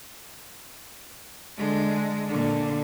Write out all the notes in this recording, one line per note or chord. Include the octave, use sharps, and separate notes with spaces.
D3 G#3
A#2 D3